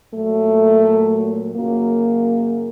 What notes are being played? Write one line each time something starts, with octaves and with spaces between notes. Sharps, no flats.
A#2 F#3 A3
F#2 C#3 F#3 A#3